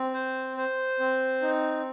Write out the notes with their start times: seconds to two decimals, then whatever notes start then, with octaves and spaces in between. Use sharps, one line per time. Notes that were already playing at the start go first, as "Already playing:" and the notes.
Already playing: C4
0.14 C5
0.57 C5
1.00 C4
1.42 D#4